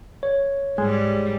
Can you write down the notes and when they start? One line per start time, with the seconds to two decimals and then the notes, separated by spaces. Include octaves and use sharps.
0.23 C#5
0.78 G#2 G3 G#3